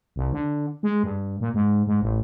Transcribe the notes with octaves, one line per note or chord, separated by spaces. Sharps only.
C2
D3
G#3
G2
A#2
G#2
G#2
A1